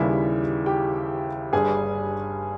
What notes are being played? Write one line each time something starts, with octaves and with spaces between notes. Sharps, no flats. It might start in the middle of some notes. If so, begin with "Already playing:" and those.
Already playing: D#2 C#3 E3 G3 E4 E5
G4 G5
G1 G2 G3 G#4 G#5